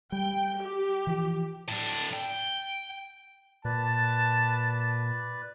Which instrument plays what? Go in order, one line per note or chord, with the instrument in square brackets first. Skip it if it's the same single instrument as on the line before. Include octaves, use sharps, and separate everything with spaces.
[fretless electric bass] G3 [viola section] G5
[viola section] G4
[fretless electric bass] E3 F3
[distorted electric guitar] A2 D4
G5
[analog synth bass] A#2 [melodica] B4 D5 [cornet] A5